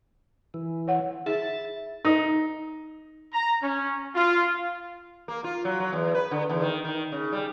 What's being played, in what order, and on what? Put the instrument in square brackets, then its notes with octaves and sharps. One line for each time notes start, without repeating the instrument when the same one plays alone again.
[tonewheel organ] E3
[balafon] C#5 F#5
[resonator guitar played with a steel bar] E4 [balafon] G#4 [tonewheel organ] A6
[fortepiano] D#4
[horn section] A#5
C#4
F4
[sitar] A#3
F4
F#3
F#3
E2
B4
D3
E2
D#3
D#3
C#3
G3